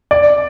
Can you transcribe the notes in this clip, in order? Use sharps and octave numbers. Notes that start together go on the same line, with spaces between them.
D5